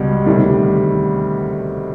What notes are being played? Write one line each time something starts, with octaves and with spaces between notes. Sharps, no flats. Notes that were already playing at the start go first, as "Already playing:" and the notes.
Already playing: C#2 B2 G3
D2 C3 D#3 G3